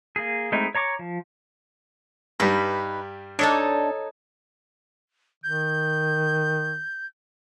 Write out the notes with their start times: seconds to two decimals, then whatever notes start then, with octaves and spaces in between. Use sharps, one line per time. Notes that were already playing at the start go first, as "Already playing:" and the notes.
0.16 A#3 G#4
0.52 G#3 A3 C4 D#4 E4
0.75 C#5 A#5 C#6 D6
0.99 F3
2.40 G2 G3 D#4 B4
3.39 D4 D#4 A4 C#5 D#5 A5
5.44 D#3 G6